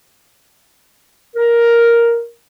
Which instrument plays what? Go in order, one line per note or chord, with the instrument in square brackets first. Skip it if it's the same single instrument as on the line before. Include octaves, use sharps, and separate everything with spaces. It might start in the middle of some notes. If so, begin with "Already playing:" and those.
[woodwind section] A#4